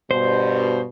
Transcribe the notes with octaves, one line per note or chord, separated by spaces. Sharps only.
G2 B2 C5